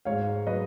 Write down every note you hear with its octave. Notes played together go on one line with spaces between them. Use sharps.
G#2 C#5 F5
F#3 B4 D#5